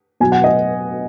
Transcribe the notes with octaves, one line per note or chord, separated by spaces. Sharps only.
B2 F#3 G#5
F#5
D#5